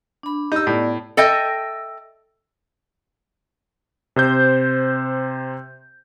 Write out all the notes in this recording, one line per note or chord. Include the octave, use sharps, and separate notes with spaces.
D4 B5
D#4 G4 E6
A2 B3 D5
A4 D#5 E5 G5
C3 C5 G6